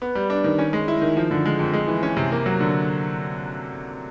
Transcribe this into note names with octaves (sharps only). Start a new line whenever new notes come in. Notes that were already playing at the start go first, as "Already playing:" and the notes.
B3
G3
D4
D#3
C#4
G#3
E4
D#3
F3
D3
G#3
F2
G#3
E3
C#4
C3
A#3
F#3
D3